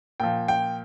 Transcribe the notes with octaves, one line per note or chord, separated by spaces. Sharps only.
A#2 F3 G5
G5